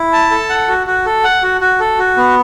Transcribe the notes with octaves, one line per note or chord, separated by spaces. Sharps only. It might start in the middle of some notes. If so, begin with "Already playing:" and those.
Already playing: E4
A5
A4
F#5
F#4
F#4
A4
F#5
F#4
F#4
A4
F#4
B3